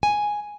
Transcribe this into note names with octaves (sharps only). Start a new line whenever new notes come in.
G#5